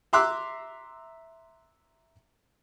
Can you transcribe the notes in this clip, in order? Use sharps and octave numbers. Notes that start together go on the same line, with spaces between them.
E5 A#5 C6 D6 E6 F#6